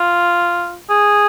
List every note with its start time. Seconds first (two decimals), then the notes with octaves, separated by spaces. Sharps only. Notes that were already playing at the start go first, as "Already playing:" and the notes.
Already playing: F4
0.90 G#4